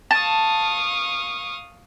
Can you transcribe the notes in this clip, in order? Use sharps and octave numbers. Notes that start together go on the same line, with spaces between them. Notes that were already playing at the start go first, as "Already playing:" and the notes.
F5 A5 C#6 D#6